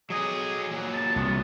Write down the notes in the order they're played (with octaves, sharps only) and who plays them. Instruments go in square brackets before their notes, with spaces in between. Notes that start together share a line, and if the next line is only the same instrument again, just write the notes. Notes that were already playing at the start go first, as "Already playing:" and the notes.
[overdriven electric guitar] F#3 D#5 [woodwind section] G#4
[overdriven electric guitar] A#2 F#3
[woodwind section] A5
[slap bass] C2 [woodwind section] C3 D#3 B3